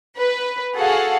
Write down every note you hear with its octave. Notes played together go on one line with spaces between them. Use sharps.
B4
F#4 G#4 A4 F5 F#5